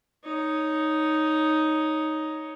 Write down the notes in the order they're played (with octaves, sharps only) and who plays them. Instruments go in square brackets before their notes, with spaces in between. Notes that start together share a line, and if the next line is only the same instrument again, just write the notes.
[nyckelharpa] D#4 C#5